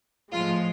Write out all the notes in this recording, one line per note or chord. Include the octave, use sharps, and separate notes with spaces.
A2 F3 G#3 F4